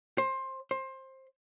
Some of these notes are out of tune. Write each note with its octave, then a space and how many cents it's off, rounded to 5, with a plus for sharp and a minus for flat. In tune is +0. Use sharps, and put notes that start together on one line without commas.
C5 +20
C5 +20